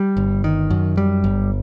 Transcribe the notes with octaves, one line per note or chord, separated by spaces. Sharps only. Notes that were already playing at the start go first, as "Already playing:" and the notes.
Already playing: G3
G1
D#3
F#2
G3
G1